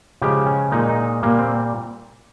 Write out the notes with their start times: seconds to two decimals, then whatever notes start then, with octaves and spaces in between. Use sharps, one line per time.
0.22 C#3 F3 G#3 G4
0.46 C#4
0.71 A#2 G#3 D#4
0.89 D#4
1.23 A#2 G3 A#3
1.39 C4